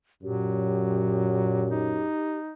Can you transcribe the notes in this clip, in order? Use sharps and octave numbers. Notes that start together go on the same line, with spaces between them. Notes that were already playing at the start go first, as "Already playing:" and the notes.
F#2 A#2 F#3 G4
D#4